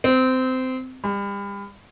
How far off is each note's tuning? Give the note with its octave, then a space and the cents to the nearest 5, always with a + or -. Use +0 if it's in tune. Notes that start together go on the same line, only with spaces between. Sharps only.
C4 -20
G3 +35